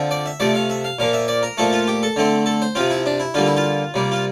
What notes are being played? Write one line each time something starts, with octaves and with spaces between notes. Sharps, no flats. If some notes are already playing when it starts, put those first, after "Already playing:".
Already playing: D3 F3 C4
D5
E5
C3 F3 A3 D5
F5
E5
F5
A#2 F3 A#3 F5
E5
D5
A#4
A#2 F3 A3 A4
F4
G4
A4
D3 A3 C4
A4
C5
C3 F3 C4 F4
E4
D4
E4
D3 G3 A#3 F4
E4
F4
C3 G3 A#3
F4